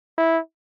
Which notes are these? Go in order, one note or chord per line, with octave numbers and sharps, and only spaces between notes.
E4